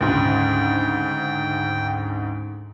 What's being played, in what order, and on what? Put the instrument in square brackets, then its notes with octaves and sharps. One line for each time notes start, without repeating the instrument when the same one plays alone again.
[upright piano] D2 G#2 C#3 [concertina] G5